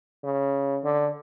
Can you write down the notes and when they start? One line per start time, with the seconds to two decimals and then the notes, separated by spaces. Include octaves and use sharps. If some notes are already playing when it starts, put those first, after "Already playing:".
0.24 C#3
0.84 D3